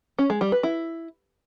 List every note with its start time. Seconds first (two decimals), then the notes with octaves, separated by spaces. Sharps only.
0.19 C#4
0.30 G#3
0.41 G3
0.52 B4
0.63 E4